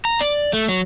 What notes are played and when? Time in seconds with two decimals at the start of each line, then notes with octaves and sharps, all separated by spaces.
0.05 A#5
0.21 D5
0.53 A3
0.69 F#3